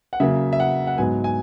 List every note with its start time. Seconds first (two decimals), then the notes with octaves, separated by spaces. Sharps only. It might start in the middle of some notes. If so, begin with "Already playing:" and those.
0.13 F#5
0.20 C#3 F#3 A#3 E5
0.53 E5
0.60 F#5
0.87 F#5
0.97 G#2 F#3 B3 G#5
1.24 G#5